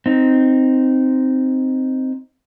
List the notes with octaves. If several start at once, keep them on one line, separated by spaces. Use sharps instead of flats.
C4 D#4